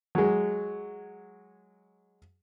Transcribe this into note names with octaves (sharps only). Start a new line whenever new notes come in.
F#3 G#3